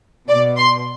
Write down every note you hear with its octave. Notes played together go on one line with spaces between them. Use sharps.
B2 D5
C6